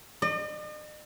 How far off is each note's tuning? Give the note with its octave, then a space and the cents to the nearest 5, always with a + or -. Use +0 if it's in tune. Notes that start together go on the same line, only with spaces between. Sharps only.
D#5 -45